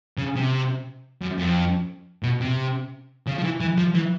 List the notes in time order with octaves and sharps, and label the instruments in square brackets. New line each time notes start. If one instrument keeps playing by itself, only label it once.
[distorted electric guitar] C#3
C3
F#2
F2
B2
C3
C#3
F3
E3
E3
F3
E3